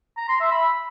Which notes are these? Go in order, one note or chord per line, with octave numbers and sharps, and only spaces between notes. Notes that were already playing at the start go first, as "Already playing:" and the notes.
A#5
C6
E5
B5